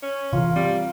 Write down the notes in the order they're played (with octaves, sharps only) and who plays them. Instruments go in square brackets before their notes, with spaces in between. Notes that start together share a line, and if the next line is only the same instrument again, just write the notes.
[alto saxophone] C#4
[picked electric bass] C3 E3 [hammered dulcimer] F4 A#4
[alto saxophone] G3 [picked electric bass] C4